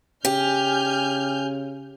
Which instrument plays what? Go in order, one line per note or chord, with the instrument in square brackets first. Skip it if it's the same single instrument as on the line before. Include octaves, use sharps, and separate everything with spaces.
[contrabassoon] C#3 [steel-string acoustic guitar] G4 [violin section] G#5 F6 G6